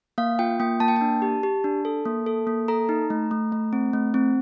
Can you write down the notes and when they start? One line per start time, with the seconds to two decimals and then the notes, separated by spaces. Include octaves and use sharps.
0.18 A#3 F5
0.39 F4 G5
0.60 A#3 G5
0.80 A#3 A5
0.88 G5
0.96 D4 A5
1.22 G4
1.43 G4
1.64 D4
1.85 A4
2.05 A#3
2.26 A4
2.47 A#3
2.68 A4 A#5
2.89 D#4
3.10 A3
3.31 A3
3.52 A3
3.73 C4
3.93 A3
4.14 C4